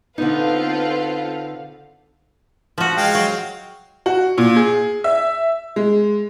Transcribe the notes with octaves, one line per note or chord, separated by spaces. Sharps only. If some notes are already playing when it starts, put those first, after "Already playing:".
D3 B3 C4 D#4 F4 A4 B4 F5
F3 F#4
G#3 F5 G5
F#3
F#4
A#2
G#4
E5
G#3